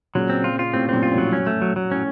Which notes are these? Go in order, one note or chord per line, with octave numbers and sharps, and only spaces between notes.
A#2 C#3 F#3
C4
F4
F4
A2 C3 C4
F#2 A#2 C4
F4
F2 A2
F#3
F#2 C#4
A3
F#3
F#3
A2 C#4